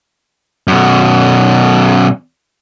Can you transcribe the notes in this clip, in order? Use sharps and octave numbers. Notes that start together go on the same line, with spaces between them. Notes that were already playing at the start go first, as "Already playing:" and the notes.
F#2 B2